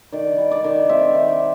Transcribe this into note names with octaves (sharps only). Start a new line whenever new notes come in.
D#3 D5
G3
D5
D#3
C4 E5
D#3